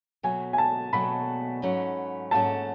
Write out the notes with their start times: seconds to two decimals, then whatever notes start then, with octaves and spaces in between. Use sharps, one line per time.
0.23 B2 F#3 A3 G#5
0.53 G#5
0.58 A5
0.93 B2 F#3 A3 B5
1.62 G#2 F#3 A3 C#4
2.31 G#2 F#3 A3 C#4 A5